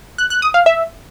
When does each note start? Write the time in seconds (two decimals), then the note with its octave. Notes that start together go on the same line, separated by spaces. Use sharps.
0.18 F#6
0.30 F#6
0.42 D#6
0.54 F5
0.66 E5